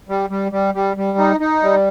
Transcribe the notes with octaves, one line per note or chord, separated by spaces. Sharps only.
G3
G3
G3
G3
G3
D#4
D#4
G3